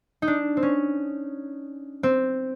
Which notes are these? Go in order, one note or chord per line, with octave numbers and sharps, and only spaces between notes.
D#4
D4
C4
C#4
C4